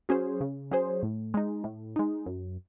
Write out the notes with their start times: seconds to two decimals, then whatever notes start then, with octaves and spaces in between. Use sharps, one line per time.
0.09 F#3 C#4 G#4 C5
0.41 C#3
0.71 F#3 C#4 G#4 C5
1.03 A2
1.34 G#3 D#4
1.64 A2
1.96 G#3 D#4
2.26 F#2